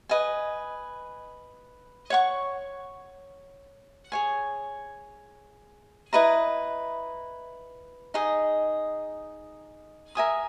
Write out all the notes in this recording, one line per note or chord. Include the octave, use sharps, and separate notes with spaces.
B4 D#5 G#5
C#5 F#5 C#6
G#4 C#5 G#5
E4 B4 D#5 A#5
D#4 G#4 D#5
A#4 E5 G#5 D#6